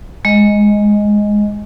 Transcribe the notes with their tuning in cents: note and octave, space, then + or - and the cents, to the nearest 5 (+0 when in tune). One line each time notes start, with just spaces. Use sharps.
G#3 +0 D#5 +0